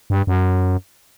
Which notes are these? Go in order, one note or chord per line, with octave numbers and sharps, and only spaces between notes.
G2
F#2